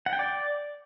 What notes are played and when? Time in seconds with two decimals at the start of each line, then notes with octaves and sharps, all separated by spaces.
0.06 F#5
0.13 G5
0.19 D5